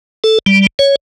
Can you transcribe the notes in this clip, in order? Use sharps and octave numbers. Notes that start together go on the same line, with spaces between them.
A4
G3
C#5